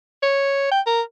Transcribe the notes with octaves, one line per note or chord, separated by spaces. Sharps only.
C#5
G5
A#4